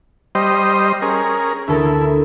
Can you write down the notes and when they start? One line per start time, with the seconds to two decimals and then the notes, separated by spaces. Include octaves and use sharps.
0.35 G3 C5 D#5
1.02 C#4 G#4 A#4
1.68 D2 E4 A4 A#4